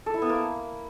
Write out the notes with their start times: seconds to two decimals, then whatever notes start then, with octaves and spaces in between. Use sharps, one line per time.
0.06 A4
0.14 E4
0.22 B3
0.29 A#3